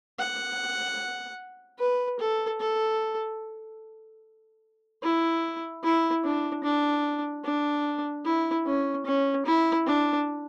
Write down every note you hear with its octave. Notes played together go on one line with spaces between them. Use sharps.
F#5
B4
A4
A4
E4
E4
D4
D4
D4
E4
C#4
C#4
E4
D4